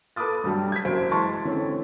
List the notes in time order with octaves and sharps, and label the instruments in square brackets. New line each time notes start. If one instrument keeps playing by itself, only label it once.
[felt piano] A4 B4 A5 D6 D#6 A6
G2 F#3 G3 A5
G#6 B6
F#1 F#2 C5 D7
E3 G#3 A5 C6 C#6 A6
D3 E3 C4 C#4